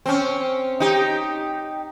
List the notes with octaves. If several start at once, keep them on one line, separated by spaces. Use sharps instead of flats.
C4 C#4
D#4 G4